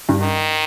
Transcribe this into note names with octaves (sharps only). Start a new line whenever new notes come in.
G2
D#3